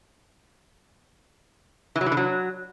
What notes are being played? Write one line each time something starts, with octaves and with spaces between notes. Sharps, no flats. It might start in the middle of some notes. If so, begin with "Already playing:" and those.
E3
F#3
E3
D3
F#3